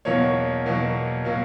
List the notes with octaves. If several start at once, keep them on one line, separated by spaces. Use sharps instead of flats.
E2 B2 F#3 A#3 C#5
E2 B2 F#3 A#3
B2 F#3 A#3